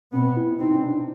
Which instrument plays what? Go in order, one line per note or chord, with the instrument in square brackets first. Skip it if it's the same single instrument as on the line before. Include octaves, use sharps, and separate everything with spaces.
[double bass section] B2 B3 [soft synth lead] C4
[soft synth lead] E4
[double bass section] C3 C4 [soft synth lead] D#4
[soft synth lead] C#4
D4